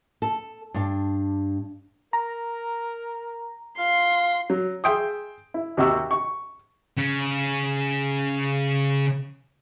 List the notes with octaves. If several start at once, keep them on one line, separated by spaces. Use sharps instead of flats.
A4
G2 D4
A#4 A#5
F4 C6
F#3
G#4 E5 G5 C6 D#6
E4
D#2 C3 F#4 C#6 E6
C#6
C#3 C#4